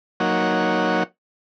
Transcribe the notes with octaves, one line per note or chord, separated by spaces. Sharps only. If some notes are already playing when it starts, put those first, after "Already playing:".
F#3 A#3 D#4 C#5 F#5